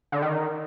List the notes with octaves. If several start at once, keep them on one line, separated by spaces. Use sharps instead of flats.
D3
D#3